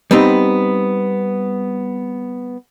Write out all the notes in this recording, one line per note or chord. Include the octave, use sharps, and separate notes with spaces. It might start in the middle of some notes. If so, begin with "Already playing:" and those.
G3 B3 C4 D#4